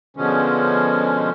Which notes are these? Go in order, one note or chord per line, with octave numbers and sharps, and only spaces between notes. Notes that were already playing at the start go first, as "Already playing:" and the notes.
B2 D3 F3 G#3 C#4